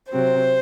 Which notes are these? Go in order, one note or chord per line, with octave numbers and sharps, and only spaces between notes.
C3 F#3 C4 C5